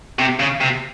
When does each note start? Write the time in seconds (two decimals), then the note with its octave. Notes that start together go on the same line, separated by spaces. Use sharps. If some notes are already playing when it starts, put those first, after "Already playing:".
0.19 C3
0.39 C#3
0.60 C3